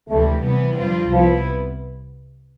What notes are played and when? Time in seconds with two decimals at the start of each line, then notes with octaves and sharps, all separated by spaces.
0.09 D2 C3 E3 G3 A3
0.43 C3 E3 G3 B3
0.77 F2 D3 G3 C4 F4
1.11 C2 C3 F3 G3 B3 E4